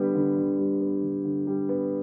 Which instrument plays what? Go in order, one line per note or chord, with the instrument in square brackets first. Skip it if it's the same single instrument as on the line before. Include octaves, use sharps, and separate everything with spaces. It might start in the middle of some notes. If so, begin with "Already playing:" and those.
Already playing: [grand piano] D3 G3 B3
D3
D3
G3
B3
D3
D3
G3
B3